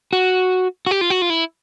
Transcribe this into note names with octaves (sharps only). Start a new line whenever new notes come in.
F#4
F#4
G4
F4
F#4
F4
E4